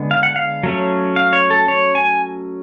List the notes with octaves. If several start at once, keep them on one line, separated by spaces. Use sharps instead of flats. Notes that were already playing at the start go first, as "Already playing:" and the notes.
Already playing: D3 G#3 B3
F5
F#5
F5
F#3 A3 C#4
F5
C#5
A4
C#5
G#5